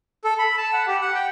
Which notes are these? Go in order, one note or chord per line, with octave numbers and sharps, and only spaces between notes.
A4
B5
A5
F#5
G4
F#5
G5